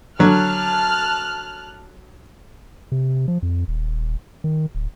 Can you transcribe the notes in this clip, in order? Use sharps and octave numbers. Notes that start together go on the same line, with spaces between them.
D3 F#3 A5 F6 F#6
C3
F3
F2
D#1
D#3
D1